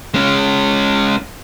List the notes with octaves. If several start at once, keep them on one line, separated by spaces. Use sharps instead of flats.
G#3 C#4